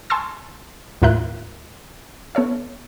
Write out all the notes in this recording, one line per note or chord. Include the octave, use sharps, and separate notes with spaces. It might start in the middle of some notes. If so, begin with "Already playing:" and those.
G#5 A5 C6 C#6 E6 A6
D#2 A2 F4 A#4 E5 F#6
B3 A4 C#5 E5